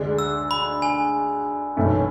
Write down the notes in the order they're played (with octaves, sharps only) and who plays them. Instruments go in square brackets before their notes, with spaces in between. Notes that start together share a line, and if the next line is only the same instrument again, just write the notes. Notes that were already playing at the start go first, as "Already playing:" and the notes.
Already playing: [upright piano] D2 D3 G#3 D4 G#4
[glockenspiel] E6
B5
G#5
[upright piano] B1 A2 E3 A3 C#4